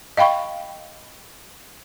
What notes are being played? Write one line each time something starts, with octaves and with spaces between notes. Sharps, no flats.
D#5 F5 G5 B5 C#6